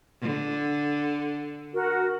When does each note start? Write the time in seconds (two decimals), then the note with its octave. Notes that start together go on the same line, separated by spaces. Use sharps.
0.21 D3
1.73 F#4 A#4